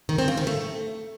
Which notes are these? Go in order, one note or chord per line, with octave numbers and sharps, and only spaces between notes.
D#3
C4
C#3
D#3
A3